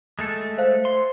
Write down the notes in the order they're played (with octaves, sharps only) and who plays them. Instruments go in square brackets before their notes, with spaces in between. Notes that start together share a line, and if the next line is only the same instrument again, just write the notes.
[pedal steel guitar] G#3 A3 A4
[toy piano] C5 F5
[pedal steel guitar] C6